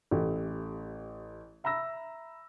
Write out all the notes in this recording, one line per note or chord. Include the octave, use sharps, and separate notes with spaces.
A1 A3 G4 A4
E5 A#5 B5 E6 A#6